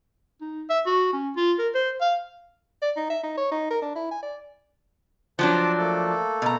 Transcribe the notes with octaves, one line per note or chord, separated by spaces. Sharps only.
D#4
E5
F#4
C#4
F4
A#4
C5
F5
D5
D#4
E5
D#4
C#5
D#4
A#4
D4
E4
G#5
D5
F3 F#3 D4 C5 A5 D6
A3 A#3 A4
B2 A#5